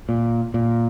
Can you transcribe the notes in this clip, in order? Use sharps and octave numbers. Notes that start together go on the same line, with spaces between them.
A#2
A#2